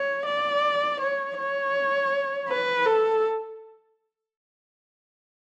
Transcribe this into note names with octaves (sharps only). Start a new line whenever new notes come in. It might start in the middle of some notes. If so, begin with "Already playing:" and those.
Already playing: C#5
D5
C#5
C#5
B4
A4